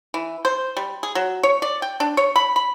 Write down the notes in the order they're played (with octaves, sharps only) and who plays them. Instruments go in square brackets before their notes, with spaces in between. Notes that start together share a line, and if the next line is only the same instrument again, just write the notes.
[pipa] E3
C5
G3
G#4
F#3
C#5
D5
G5
D4
C#5
B5
B5